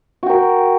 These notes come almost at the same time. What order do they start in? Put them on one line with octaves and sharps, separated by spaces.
F#4 G5 A#4